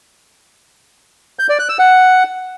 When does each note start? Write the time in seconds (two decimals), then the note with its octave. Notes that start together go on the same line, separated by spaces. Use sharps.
1.39 G6
1.49 D5
1.59 F#6
1.69 E6
1.79 F#5